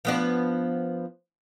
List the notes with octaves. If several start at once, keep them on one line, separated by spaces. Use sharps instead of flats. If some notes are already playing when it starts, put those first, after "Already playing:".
F3 B3 D4